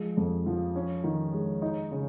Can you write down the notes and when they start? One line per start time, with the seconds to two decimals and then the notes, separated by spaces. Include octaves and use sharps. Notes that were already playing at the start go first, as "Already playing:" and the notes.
Already playing: F3 G#3
0.17 F2
0.46 F3
0.76 C#4
1.04 D#3
1.33 G#3
1.62 D#4
1.91 C#3